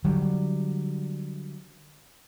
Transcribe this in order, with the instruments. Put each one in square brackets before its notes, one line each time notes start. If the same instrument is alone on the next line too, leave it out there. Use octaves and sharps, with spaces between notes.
[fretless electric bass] D3 F#3 G3